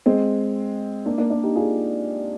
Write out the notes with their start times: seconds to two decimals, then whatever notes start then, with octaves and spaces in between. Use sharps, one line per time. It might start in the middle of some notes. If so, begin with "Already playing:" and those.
0.06 G#3 C4
1.06 A#3 D4
1.18 A#3 D4
1.30 A#3 D4
1.43 D#4 G4
1.55 F4 G#4